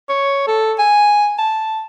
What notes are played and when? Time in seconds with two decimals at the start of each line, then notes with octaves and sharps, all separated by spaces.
0.09 C#5
0.47 A4
0.79 G#5
1.38 A5